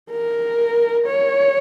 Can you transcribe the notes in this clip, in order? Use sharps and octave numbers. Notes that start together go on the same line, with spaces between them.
A#4
C#5